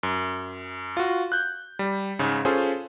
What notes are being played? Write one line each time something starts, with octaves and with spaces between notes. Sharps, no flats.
F#2
F4 F#4
F#6 G6
G3
G#2 C#3
C#4 F4 G#4 A4 C5